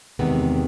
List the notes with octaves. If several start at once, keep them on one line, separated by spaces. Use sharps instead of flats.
E2 C3 D#3 G#3 B3